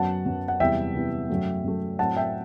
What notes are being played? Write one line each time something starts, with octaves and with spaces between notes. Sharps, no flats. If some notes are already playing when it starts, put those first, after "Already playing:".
Already playing: F#2 F#3 B3 F#5 A5
F#2 F#3 B3
F#5
E2 C3 E3 G3 E5 G5
E2 C3 E3 G3
F#2 F#3 A3
F#2 F#3 A3
A2 F#3 C4 F#5 A5
E5 G5